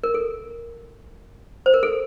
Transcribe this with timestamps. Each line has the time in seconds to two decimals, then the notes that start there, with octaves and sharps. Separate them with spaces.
0.04 A#4
0.14 A4
1.66 C5
1.74 A#4
1.83 A4